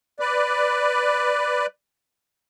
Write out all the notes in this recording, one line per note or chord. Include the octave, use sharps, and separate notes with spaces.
B4 D5